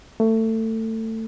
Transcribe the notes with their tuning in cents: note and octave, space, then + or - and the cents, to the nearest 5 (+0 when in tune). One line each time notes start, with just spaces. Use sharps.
A3 +25